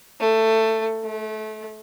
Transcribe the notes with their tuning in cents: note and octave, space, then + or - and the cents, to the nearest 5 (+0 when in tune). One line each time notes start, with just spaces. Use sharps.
A3 +15
A3 -25